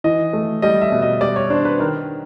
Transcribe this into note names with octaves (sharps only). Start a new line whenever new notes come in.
E3 D#5
A3
G3 D#5
E5
B2
D#5
G3 D5
C#5
D4 C5
B4
D#3 A#4